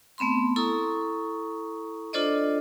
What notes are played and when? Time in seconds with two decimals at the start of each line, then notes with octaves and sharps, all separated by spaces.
0.18 A3 B3 C4 B5 C6
0.56 E4 A4 A#5 C#6 D#6
2.13 D4 F4 A4 C5 D5 D#5